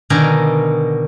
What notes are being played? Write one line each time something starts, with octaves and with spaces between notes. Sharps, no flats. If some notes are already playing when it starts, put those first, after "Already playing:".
B2 D3 D#3 A#4 G#5